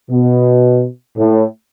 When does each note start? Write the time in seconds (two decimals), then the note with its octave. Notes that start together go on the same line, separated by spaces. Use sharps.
0.09 B2
1.17 A2